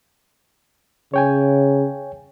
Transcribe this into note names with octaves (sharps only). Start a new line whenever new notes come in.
C#3 C#5 G5 G#5